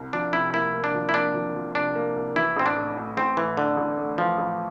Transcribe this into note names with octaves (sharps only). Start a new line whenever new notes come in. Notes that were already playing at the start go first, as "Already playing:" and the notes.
Already playing: C2
F3 D4
C3 E4
A#3 E4
A#3
D4
F3
E4
A#3 D4
F3
F3
C3 D4
A#3
C2
E3 E4
A1 C4
D4
A2
A2
A1 C4
A2 E3
D3 A3
A1
A3
E3 F3
A1